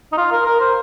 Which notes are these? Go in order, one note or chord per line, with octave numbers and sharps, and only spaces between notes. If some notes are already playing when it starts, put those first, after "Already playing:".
D#4
F4
A#4
A#4
C5